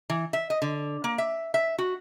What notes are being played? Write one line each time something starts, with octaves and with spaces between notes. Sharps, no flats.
E3
E5
D#5
D3
A#3
E5
E5
F#4